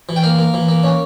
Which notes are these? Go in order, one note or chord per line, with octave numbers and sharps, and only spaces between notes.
E3
G5
A#3 F5
A#3
E3
A#3
C#4